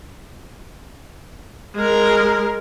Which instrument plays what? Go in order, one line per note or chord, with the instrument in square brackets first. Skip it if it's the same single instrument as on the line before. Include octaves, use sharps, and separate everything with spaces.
[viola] G#3 A#4